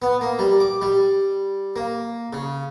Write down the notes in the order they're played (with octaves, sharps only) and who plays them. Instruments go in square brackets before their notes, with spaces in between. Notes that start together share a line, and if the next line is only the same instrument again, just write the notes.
[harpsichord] B3
A#3
G3
D6
G3
A#3
C#3